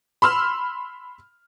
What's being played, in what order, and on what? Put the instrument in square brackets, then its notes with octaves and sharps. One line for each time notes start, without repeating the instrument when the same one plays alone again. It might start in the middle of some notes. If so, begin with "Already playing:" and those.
[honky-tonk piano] B5 C6 E6 F6